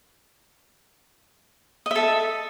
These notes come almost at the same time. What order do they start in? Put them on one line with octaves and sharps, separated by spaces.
D#5 E5 A4